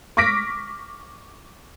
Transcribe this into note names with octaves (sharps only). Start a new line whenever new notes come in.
C#6 D6 F6 A#6 B6 D7